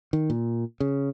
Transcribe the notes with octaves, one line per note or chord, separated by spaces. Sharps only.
D#3
A#2
C#3